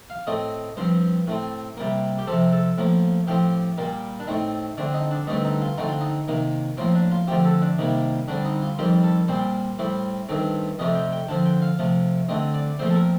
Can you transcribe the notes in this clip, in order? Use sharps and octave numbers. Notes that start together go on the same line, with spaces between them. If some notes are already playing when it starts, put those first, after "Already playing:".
F5
A2 A3 C4 D#5
G2 F3 C4 C5
A2 A3 C4
C3 G3 A#3
G4
C3 F3 C4 A4
A4
A2 F3 A#3
A2 F3 C4 G4
A#2 G3 A#3
D4
A2 A3 C4 D#4
D3 A3 C4 D4
D#4
D4
G2 D3 A3 C4 D#4
D#4
F4
D3 A3 C4 D#4
F4
D#4
C3 D#3 A#3
A2 F3 A#3 C4
D4
F4
D3 F3 A3 C4 G4
A4
D4
C3 D#3 G3 A#3
D3 G3 C4 D4
D#4
F4
F2 D#3 G3 C4 G4
A4
A#2 G3 C4 C5
A2 G3 C4
G2 D#3 A3 C4
F2 C3 F3 A3 C4 D#5
G5
G5
D3 F3 C4 A5
G5
F5
C3 F3 A3
D3 A3 C4 D#5
D5
A#2 F3 A3 C4 C5
A4
A#4